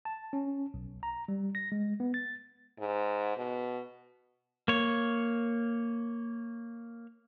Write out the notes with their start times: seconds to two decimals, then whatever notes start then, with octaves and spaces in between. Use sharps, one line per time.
0.05 A5
0.33 C#4
0.74 B1
1.03 A#5
1.28 G3
1.55 A#6
1.72 G#3
2.00 B3
2.14 A6
2.79 G#2
3.38 B2
4.68 A#3 C#5